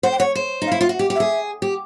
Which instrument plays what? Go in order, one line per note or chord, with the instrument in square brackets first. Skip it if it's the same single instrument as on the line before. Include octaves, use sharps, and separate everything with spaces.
[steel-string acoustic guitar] C5 [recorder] F#5
[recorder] G5
[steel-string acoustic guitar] C#5 [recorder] F#5
[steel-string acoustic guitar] C5
D#4
[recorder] F5
[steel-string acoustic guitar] E4
F4
F#4
G4
G4
[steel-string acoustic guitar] G#4 [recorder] E5
[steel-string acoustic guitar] G4